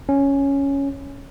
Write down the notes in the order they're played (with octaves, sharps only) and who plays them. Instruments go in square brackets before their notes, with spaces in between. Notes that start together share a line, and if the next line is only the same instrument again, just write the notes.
[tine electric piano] C#4